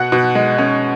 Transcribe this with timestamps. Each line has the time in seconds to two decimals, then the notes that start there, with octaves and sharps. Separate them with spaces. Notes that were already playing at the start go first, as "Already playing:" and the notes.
Already playing: B2 F#5 F#6
0.12 B2
0.35 G#3
0.58 C#4